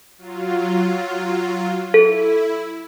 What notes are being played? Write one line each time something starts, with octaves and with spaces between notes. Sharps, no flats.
F#3 F4
E4 A4